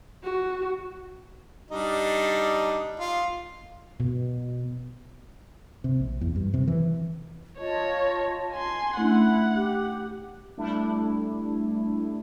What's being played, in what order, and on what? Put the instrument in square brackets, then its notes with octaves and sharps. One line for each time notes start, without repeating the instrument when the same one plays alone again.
[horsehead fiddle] F#4
[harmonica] G3 D4 D#4
F4
[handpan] B2
[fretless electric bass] C3
A#1
E2
G2
C3
E3
[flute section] F4 D#5 A5 [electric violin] C#5
[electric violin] G#5 C6
[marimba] A3 C#4 D4 [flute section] E4 [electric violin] F#5
[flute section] G4
[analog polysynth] G3 A3 D4 E4